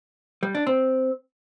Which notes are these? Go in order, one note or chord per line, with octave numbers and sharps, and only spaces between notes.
G3
D4
C4